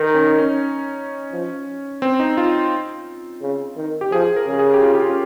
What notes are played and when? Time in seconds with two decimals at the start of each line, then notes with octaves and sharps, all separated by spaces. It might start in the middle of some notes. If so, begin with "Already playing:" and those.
Already playing: D#3 D#4
0.15 C#4
0.38 C#4
1.32 F3
2.02 C4
2.20 D#4
2.37 F4
3.42 C#3
3.77 D#3
4.01 G4
4.12 F3 G#4
4.36 A#4
4.47 C#3
4.59 G#4
4.74 G4
4.82 F4
4.95 G4
5.00 F4
5.09 C#4